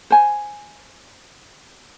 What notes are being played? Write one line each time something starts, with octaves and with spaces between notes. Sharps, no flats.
C5 G#5